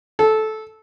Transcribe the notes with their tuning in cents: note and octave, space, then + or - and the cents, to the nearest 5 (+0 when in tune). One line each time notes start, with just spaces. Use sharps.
A4 -15